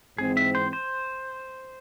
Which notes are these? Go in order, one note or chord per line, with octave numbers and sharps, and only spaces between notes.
G#2 E3 G#3 C4 G#4
E5
C5
C5